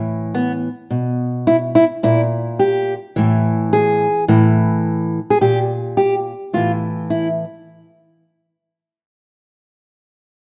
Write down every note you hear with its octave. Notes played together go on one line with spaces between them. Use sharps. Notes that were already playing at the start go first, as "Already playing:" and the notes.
Already playing: A2 E3
B3
B2
E4
E4
A#2 E4
G4
A2 E3
G#4
A2 E3
G#4
A#2 G4
G4
A2 E3 F4
E4